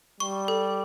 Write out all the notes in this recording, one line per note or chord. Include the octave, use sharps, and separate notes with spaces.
G3 C#6
A4